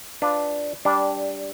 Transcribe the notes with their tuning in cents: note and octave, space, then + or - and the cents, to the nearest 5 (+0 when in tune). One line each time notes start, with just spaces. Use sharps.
D4 +0 F4 +0 B4 +20
G3 +0 D4 -10